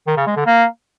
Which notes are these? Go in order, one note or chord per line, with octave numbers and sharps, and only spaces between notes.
D#3
C#3
G#3
D3
A#3